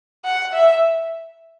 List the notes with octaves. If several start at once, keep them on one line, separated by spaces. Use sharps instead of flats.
F#5
E5